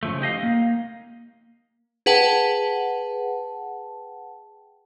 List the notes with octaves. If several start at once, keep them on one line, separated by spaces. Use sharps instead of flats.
C#3 F3 A3
D#4 G4 D#5 F5
A#3
G#4 B4 F#5 G5 A5